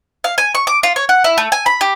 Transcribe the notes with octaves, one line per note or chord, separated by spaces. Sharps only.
F5
G#5
C#6
D6
F4
C#5
F#5
E4
A3
G#5
B5
G4